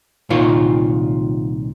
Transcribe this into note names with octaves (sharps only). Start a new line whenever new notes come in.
C2 A#2 D#3 F4 C#5